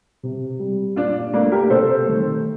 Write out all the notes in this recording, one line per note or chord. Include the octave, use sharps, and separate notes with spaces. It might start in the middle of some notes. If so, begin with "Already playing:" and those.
C3
G3
A#2 D4 F4
A3 A#3 D4
G4 A#4
C3 A4 C5
D#3 A3